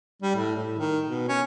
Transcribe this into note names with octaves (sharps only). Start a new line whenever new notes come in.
G3
A2
A2
D#3
B2
C#4